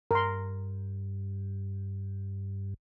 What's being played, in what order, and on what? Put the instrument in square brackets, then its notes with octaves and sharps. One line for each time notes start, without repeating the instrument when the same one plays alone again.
[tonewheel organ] G2 [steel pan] A#4 C6